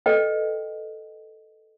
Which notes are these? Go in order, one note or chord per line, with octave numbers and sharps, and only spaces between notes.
A4 B4 D#5 G5